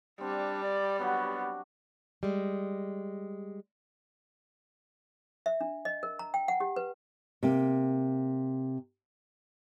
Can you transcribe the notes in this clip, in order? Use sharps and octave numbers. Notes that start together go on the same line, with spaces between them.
G3 C4 D4
D5
F#3 B3 D4 F#4
G3 G#3
E5
D4
D#5
A#4
A#5
G5
F#5
G4
B4
C3 A#3